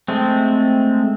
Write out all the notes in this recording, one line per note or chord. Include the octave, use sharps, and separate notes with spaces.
G#3 A3 C4